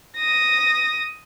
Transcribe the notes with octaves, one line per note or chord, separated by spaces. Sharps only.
D#6 A#6